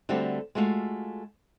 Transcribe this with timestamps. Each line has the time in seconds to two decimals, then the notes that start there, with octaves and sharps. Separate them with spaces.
0.09 D3 G3 A3 C4 F#4 G4
0.55 G#3 A3 F4 F#4 F5